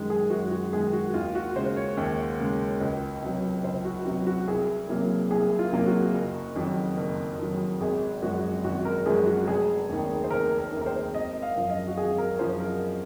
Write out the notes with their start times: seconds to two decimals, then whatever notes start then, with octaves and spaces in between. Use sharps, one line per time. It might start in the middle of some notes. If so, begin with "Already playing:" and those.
Already playing: F#2 D#3 G#3
0.10 G#4
0.30 F#2 F#4
0.52 F#4
0.72 D#3 G#3 G#4
0.93 F#4
1.14 D#2 F4
1.35 F#4
1.56 C#3 G#3 C5
1.76 C#5
1.97 D#2
2.39 C#3 G#3
2.81 C#2
3.22 C3 F#3
3.64 C#2 C5
3.85 F#4
4.05 C3 F#3 F#4
4.27 F#4
4.48 C2 G#4
4.89 C3 F#3 A#3
5.31 C2 G#4
5.59 F4
5.72 C3 F#3 A#3
5.86 F#4
6.14 F#1
6.56 F2 D#3 F#3
6.97 F#1
7.39 F2 D#3 F#3
7.81 G#1 G#4
8.22 F#2 F3 G#3 F#4
8.64 G#1 F#4
8.85 A#4
9.06 F#2 F3 G#3 G#4
9.26 F#4
9.47 F1 G#4
9.89 D#2 D#3
10.24 C5
10.31 F1 A#4
10.59 A#4
10.72 D#2 D#3
10.82 A#4
10.86 C5
11.14 G#1 D#5
11.42 F5
11.56 F#2 F3
11.70 D#5
11.87 F#4
11.97 G#1 G#4
12.18 A#4
12.39 F#2 F3 C5
12.60 A#4